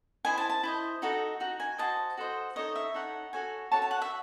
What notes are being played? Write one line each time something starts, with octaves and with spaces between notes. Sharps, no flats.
E4 C5 D#5 G#5
A5
A5
E4 C5 D#5
D#4 F#4 A4 D#5
D#4 F#4
G#5
F#4 A4 C5 D#5 A5
F#4 A4 C5 D#5
D#4 A4 C#5 D#5
E5
D#4 A4 C#5 F#5
F#4 A4 C#5 G#5
F#4 A4 C#5 A5
A5
F#5
E5